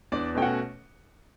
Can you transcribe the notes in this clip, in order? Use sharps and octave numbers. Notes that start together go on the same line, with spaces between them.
E2 D4 D5
B2 A3 C#4 G5
F#4 F#5